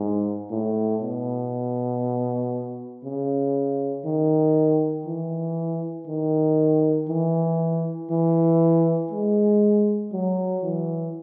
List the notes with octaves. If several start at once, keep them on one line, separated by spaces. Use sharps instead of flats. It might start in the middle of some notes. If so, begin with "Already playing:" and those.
Already playing: G#2
A2
B2
C#3
D#3
E3
D#3
E3
E3
G#3
F#3
E3